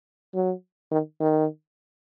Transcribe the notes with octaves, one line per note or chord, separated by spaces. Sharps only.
F#3
D#3
D#3